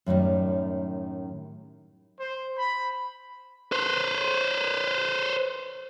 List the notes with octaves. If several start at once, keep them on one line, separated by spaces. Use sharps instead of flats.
F#2 A2 D#3 G3
C5
B5
B4 C5